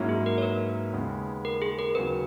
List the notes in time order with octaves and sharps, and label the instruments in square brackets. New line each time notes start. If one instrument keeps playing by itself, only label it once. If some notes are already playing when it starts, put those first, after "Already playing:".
Already playing: [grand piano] G#2 F#3 A#3 C#4 E4
[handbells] G#4
A#4
C#5
B4
[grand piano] D#2 C#3 G#3 B3
[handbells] A#4
G#4
A#4
[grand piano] D#2 C#3 F#3 [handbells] B4